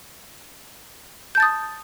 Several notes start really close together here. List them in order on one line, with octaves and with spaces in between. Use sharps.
G6 A5 A6 D#6